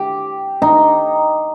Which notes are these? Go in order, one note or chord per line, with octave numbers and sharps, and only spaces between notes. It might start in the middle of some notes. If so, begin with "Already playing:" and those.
Already playing: G4
D#4